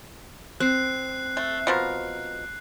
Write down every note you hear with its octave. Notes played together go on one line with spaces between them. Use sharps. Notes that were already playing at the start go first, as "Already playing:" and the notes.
C4 F#6 C7
A3
B2 F3 A#4